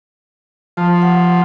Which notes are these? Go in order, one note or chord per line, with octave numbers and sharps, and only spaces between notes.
F3 A5
F#5